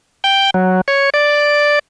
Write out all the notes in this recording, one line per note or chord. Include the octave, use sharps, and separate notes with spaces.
G5
F#3
C#5
D5